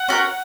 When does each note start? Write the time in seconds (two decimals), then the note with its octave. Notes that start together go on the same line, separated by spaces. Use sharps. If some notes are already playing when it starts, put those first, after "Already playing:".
Already playing: F#5
0.08 C#4 F#4 A#4